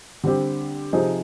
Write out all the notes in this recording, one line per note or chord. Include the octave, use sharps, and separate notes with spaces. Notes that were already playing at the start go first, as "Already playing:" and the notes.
D3 G3 C4 G4
C3 F3 C4 D#4 G#4